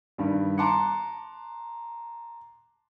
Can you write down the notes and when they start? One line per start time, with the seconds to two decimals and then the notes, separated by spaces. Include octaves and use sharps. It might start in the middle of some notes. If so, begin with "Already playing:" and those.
0.18 G2 D#3 G3
0.58 A5 A#5 C6 D6 F#6 C#7